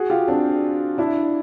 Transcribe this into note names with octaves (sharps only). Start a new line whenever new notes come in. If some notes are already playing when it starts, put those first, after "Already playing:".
Already playing: F#4 G#4
F4 G4
C4 D4
D4 E4